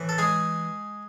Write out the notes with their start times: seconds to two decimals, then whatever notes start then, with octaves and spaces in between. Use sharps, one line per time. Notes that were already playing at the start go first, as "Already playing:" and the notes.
Already playing: A2 E3
0.09 A4
0.18 G#3 G#4